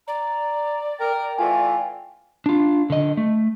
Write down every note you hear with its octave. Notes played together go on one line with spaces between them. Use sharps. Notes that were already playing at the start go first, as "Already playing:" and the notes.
D5 A#5
A#4 G5
E3 A3 F4 G#5
D4 F4
D3 D#5
A3